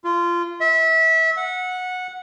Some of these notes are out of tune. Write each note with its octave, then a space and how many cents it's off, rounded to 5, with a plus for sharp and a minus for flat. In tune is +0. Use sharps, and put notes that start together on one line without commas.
F4 -20
E5 -25
F#5 -15